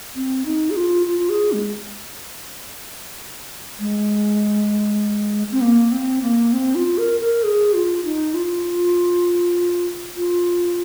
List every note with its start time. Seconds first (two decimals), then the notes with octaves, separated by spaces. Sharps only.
0.16 C4
0.46 D#4
0.70 G#4
0.76 F4
1.07 F4
1.29 G#4
1.52 G#3
3.80 G#3
5.52 C4
5.61 A#3
5.92 C4
6.22 A#3
6.53 C4
6.75 F4
6.98 A#4
7.20 A#4
7.43 G#4
7.73 F4
8.04 D#4
8.34 F4
10.16 F4